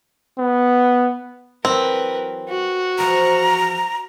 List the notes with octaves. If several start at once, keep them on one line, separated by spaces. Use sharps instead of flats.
B3
E3 F#3 C4 A#4 B4
F#4
E2 F3 A#5